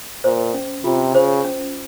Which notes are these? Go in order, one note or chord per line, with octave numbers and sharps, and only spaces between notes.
A#2 C5
C#4
C3 F4
C#3 C5
C#4